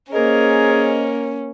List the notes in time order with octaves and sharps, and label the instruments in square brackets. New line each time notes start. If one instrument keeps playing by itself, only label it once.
[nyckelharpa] A#3 A#4 [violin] C#4 [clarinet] G#4 [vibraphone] C5 D#5